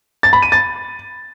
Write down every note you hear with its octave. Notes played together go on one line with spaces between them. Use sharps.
A6
B5
D#7
A6